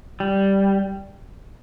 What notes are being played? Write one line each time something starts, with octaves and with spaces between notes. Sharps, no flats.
G3